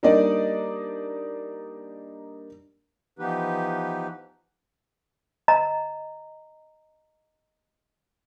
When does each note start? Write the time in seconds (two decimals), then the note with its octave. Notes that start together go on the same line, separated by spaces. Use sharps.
0.03 G3 A#3 D4 D#4 D5 D#5
3.19 E3 F3 B3 D#4 G4 B4
5.48 D#5 A#5